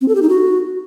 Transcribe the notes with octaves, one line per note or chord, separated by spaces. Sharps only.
C4
A4
G4
D#4
F#4